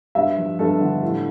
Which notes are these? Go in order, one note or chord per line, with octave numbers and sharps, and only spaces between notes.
G2 E5
F3
G2 A4
D3
A2